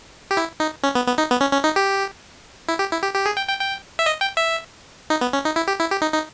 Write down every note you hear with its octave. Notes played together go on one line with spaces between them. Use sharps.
G4
E4
D#4
C#4
B3
B3
D#4
B3
C#4
C#4
D#4
G4
E4
G4
E4
G4
G4
G#4
G5
G5
G5
E5
D#5
G5
E5
D#4
B3
C#4
D#4
E4
G4
E4
G4
D#4
D#4